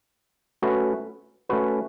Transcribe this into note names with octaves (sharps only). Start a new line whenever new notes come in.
A3 C#4 F#4 B4
A3 C#4 F#4 B4